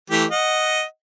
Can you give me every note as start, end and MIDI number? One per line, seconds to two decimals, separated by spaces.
0.10 0.25 52
0.10 0.25 57
0.10 0.25 67
0.31 0.83 75
0.31 0.83 78